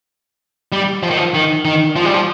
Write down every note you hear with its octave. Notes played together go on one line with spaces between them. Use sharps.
G3
F3
D#3
F3
D#3
D#3
F3
G3
F3